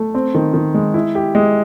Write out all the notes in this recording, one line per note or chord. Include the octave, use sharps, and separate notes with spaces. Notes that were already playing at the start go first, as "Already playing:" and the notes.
Already playing: A3
C4
D#3
D#3
G#3
E4
G4
G#3